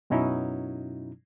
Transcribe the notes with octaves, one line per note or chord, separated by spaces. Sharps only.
F#2 B2 F#3 C#4 D#4 E4